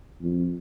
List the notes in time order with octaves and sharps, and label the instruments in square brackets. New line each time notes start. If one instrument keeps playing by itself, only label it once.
[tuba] F2